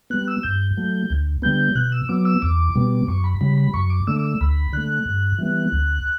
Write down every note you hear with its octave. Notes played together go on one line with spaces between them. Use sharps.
G3 B3 F#6
E6
G2 G6
F#3 A3
D2
D3 G3 B3 G6
B2 F#6
E6
F#3 B3 D6
E6
E2 D6
B2 G3 B3
F#2 C#6
B5
C#3 G3 B5
B5
F#2 C#6
D6
D3 A3 E6
D6
E6
D2 B5
D3 A3 F#6
G2
E3 G3 B3
D2